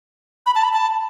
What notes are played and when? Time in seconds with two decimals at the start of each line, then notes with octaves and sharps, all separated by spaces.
0.46 B5
0.55 A5
0.64 B5
0.73 A5